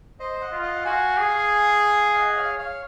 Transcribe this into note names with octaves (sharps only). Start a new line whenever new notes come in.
C5 D#5
D#5 F#5
F4
D#5 F#5
F#4 F5 G#5
G#4
D#5 F#5
C#5 F5
C#5 F5